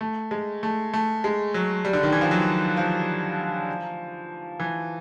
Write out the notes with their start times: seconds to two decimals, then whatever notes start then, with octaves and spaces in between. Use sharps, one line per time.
0.01 A3
0.31 G#3
0.63 A3
0.93 A3
1.24 G#3
1.54 F#3
1.85 G3
1.93 D3
2.03 D#3
2.12 E3
2.21 F3
2.31 F#3
2.77 F3
4.60 E3